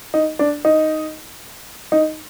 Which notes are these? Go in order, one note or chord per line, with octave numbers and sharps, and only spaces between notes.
D#4
D4
D#4
D#4